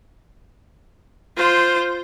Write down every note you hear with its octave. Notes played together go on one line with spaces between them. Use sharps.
F4 C5